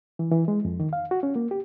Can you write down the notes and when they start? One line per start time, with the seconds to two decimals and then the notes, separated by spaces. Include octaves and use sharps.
0.19 E3
0.32 E3
0.48 G#3
0.65 F2
0.80 D#3
0.93 F5
1.11 F#4
1.23 C#4
1.36 A#3
1.51 G4